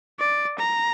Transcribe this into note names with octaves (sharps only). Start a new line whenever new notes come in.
D5
A#5